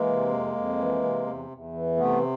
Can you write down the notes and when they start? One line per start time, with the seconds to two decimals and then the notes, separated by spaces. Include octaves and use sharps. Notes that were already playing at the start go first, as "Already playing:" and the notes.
Already playing: E3 G#3 A#3
0.09 C3
0.32 F2
0.55 F2
0.79 E3
1.04 C3
1.26 E2
1.51 E2
1.73 E3
1.97 C3 A3 B3